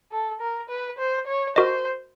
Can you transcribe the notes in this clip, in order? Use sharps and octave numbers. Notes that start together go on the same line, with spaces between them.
A4
A#4
B4
C5
C#5
F#4 A#4 C5 D#5